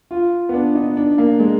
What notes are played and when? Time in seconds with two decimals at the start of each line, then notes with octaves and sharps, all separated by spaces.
0.11 F4
0.49 B3
0.54 D4
0.75 D#4
0.97 D4
1.18 A#3
1.40 G#3